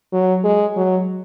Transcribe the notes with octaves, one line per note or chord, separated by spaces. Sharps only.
F#3
G#3
F#3